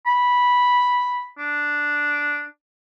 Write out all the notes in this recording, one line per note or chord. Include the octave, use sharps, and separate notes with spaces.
B5
D4